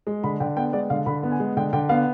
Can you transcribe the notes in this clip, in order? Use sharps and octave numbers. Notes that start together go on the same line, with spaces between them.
G#3
D3 B5
D3 G5
B3 G5
G#3 D5
D3 F5
D3 B5
B3
G#5
G#3
D3 G5
D3 G5
B3 F5